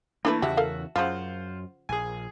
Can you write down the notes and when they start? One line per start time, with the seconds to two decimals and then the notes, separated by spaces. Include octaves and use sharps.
0.25 E3 A3 A#3 D4 E4 B4
0.42 E2 C#3 E3 F#4 G4 E5 A5
0.57 A4 A#4 F5
0.96 F#2 C#3 F3 F4 C5 F#5
1.89 A#1 G#4 G#5